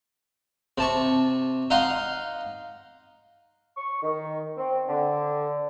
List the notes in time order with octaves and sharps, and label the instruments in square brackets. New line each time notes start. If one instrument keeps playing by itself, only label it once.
[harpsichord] C3 A5 C#6
D#4 F5 F#5 C6
[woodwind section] C#6
D#3
C4
D3